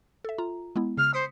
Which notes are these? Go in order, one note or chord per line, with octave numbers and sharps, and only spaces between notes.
A4 E5
F4 A#5
G#3 B3 E4
C#3 F6
C5 D#6 B6 C#7